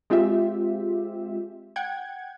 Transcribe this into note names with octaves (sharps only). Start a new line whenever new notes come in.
G#3 C4 F4 G4 E5
F#5 G5 G#6